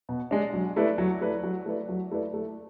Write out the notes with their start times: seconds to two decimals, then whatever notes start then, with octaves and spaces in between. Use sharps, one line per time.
0.09 B2
0.31 G#3 D4
0.54 F#3
0.76 A3 E4 B4 D5
0.98 F#3
1.21 A3 E4 B4 D5
1.43 F#3
1.66 A3 E4 B4 D5
1.89 F#3
2.11 A3 E4 B4 D5
2.34 A3